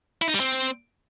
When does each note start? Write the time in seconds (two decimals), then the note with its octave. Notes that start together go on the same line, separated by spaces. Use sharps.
0.22 E4
0.28 D#4
0.34 G3
0.40 C4